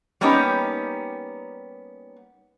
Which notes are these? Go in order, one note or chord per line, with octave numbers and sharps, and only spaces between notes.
G3 A#3 B3 C#4 D#4 G4